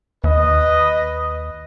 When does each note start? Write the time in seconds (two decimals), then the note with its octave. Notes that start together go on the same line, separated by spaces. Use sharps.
0.24 D#2 B4 D#5